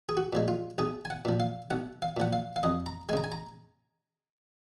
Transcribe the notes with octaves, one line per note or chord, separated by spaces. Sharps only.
G#4
F#4
A#2 F3 G#3
F4
B1 G#4
G#5
F#5
A#2 F3
F5
B1 F#5
F5
A#2 F3 F#5
F5
F5
F2 D#5
A#5
C#3 G#3 G#5 A#5
G#5
A#5